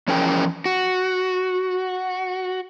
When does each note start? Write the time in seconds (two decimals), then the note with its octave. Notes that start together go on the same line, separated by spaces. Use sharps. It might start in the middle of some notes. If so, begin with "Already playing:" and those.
0.08 E2 F3 C#4 G#4 A#4 G5
0.66 F#4